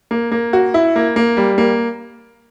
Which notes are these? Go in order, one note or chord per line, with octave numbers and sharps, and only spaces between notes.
A#3
A#3
F#4
E4
A#3
A#3
G3
A#3